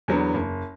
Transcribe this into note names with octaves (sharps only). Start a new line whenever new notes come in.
E2 D3 F#3 B3
F#1